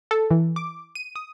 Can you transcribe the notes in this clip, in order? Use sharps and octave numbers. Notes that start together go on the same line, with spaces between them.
A4
E3
D6
D#7
D#6